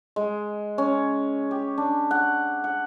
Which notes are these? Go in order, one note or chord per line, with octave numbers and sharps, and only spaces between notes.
G#3
C#4
G4
D4
F#5
F#5